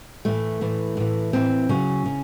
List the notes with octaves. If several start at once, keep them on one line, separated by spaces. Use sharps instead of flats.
A2 E3 A3
A2 E3
A2 E3
A2 E3 C4
C#3 F#3 C#4
C#3